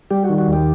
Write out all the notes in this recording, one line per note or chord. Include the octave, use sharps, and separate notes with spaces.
G3 G4
F#4
D#3
F#4
D#2 G4